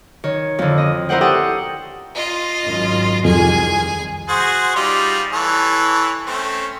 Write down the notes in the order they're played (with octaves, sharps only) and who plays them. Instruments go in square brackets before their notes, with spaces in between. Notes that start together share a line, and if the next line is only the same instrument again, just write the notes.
[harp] D#3 C#5
F2 D3
D#5
E4 A#4 C5 F#5 G5
G4 A4 F#5 G5 C#6 D#6
[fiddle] F4 D#5
[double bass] G#1 F#2
[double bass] C2 D#3 [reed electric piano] F2 [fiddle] G#4 G#5
[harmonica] F#4 G#4 C5
G3 D#4 F4
E3 A4 C#5
A3 C4 C#4